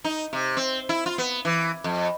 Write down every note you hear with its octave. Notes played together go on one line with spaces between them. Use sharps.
D#4
C3
C4
E4
F4
B3
E3
F2